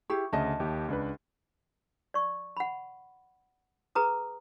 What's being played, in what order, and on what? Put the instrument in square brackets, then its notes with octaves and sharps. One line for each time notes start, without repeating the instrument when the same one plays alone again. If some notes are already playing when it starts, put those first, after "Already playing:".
[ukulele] E4 G4 G#4 [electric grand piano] C#6
[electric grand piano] D2 C#3 [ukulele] D#5 E5 A5
[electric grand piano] D#2 G4
C#2 D4 B4
[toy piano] D5 C#6
F#5 B5
G#4 B4 A#5 D#6